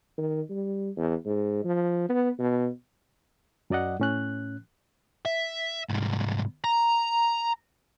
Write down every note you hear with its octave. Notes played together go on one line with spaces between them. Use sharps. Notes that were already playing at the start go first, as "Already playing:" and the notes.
D#3
G3
E2
G#2
F3
B3
B2
F#2 F#3 D5 D#5 F#5
A2 C#4 F#6
E5
C2 G#2
A#5